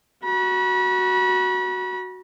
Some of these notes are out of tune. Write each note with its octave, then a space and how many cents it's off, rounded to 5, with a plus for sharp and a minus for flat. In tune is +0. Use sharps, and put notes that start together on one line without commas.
F#4 +0 B5 -40